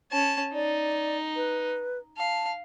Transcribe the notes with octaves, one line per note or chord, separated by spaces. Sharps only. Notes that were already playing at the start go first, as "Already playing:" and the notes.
C#4 A5
D#4 D5
B4
F5 A5